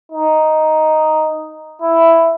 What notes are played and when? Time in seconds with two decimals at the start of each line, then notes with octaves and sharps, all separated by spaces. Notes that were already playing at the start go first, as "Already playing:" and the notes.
0.12 D#4
1.82 E4